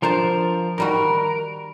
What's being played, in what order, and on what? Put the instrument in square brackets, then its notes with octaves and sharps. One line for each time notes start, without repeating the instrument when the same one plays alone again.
[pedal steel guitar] F3 A#4 [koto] D4 C5 A5
[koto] D#3 G3 F#4 [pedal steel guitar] A#4